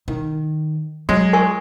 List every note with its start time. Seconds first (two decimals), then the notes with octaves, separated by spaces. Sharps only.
0.08 D#3
1.09 F#3 G#3
1.33 A#4 G#5 C#6